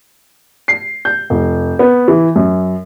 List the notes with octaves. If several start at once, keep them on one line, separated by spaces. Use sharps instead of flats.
C7
G6
F1
B3
E3
F#2